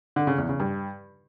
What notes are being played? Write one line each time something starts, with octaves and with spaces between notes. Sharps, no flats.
D3
C#3
E2
C#3
G2